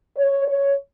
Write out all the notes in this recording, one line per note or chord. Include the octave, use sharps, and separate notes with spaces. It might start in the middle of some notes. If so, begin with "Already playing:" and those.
C#5
C#5